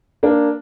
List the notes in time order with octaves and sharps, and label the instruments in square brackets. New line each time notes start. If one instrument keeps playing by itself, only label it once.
[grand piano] A#3 D4